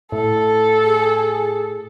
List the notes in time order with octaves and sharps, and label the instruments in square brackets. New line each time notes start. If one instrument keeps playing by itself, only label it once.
[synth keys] A2 [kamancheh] A4
[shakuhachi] G#4